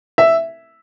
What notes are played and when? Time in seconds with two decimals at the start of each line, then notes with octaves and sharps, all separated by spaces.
0.18 E5